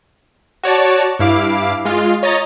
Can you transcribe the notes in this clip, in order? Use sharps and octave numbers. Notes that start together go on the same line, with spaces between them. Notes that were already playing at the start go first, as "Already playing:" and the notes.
F#4 C#5 D5 A5
G2 E4 F5 D6
G#3 F4
C#5 D#5 A#5 A6